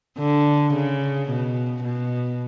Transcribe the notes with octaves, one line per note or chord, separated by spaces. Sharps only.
D3
C#3
B2
B2